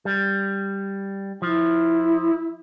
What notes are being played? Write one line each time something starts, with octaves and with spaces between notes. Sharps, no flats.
G3
F3 E4